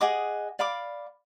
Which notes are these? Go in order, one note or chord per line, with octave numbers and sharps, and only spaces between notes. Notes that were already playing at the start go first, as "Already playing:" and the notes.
G#4 D#5 F#5 D6
D5 F5 B5 D6